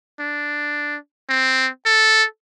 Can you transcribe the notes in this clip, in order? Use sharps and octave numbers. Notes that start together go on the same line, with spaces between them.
D4
C4
A4